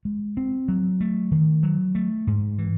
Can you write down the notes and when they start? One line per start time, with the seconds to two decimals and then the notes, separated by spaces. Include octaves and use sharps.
0.05 G#3
0.37 C4
0.68 F#3
1.01 A3
1.31 D#3
1.63 F#3
1.95 A3
2.27 G#2
2.58 E3